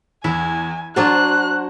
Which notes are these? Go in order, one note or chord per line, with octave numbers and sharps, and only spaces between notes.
E2 E4 G#5
F#3 D4 F4 F#4 C5 F#6